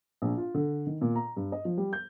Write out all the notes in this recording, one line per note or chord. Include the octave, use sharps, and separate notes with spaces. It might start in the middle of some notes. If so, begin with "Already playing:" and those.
A#1
F4
D3
D#3
A#2
A#5
G2
D#5
F3
G3
G6